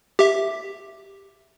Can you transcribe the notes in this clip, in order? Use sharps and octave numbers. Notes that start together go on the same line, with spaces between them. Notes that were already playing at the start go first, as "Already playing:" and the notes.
G4 E5